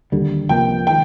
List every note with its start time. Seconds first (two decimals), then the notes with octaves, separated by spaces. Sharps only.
0.12 D#2 D3 G3
0.49 C2 C3 F3 A#3 G5
0.86 D#3 G#3 G5